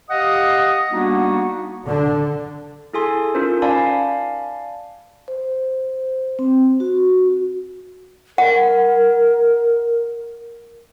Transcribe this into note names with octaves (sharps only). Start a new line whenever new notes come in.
G4 D#5 F5 F#5 D#6
G3 A#3 B3 D4 D#4 F#4
D3
E4 G#4 A4 G#5 C6
C#4 D#4 F4 A#4 C5
D5 F5 G#5 A5 B5
C5
C4
F#4
A#4 F#5